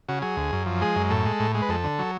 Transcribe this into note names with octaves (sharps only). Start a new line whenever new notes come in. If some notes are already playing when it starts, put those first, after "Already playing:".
C#3 F#4
F#3 G#4
D2
F#2
F3
G#3 G#4
F#2
A2 A4
G#3
A2
G#3
B4
F2 A4
D3
F#3